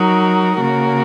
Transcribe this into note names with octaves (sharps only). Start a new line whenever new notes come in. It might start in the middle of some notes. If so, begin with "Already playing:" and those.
Already playing: F#3 D#4 F#4 A#4
C#3 A#3 F#4 A#4